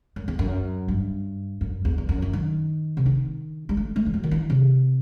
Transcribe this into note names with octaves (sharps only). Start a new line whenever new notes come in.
F#2
E2
F#2
G2
F#2
E2
E2
F#2
E3
D#3
C3
D#3
G3
A3
A3
E3
F#3
D#3
E3
C3